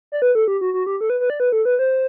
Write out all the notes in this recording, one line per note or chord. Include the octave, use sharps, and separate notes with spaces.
D5
B4
A4
G4
F#4
F#4
G4
A4
B4
B4
D5
B4
A4
B4
C5